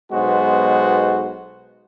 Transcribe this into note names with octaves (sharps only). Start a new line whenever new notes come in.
B1 G#3 B3 F#4 C5